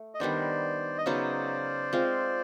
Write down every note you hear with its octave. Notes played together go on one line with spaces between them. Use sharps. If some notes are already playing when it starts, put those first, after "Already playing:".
Already playing: A3
D#5
D#3 G3 B3 D4 C5 D5
D#5
C#3 F#3 B3 D#4 C5 D5
G#3 C4 F4